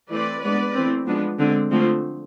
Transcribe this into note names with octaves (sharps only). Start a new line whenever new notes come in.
E3 A3 C4 B4 D5
G#3 B3 D4 B4 D5
E3 A3 C4
F3 G#3 B3 D4
D3 G#3 C4
D3 F3 A3 C4